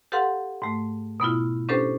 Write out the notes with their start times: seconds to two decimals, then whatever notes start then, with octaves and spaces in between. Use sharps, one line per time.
0.12 G4 A4 B4 F5 F#5 C6
0.62 G#2 A3
1.20 B2 B3 E4 F4
1.69 C#4 D4 G4 A4 B4 C5